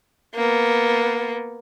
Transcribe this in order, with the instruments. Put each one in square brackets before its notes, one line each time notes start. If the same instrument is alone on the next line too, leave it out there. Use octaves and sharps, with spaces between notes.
[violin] A#3 B3